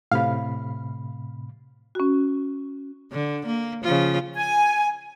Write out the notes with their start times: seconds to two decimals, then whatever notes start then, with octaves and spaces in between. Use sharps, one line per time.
0.11 A2 C3 F5 B5
1.95 C#4 F#4
3.12 D3
3.46 A#3
3.83 C#3 F3 F4
4.35 G#5